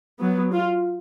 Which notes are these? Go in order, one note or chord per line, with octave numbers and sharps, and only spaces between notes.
F#3 B3
F4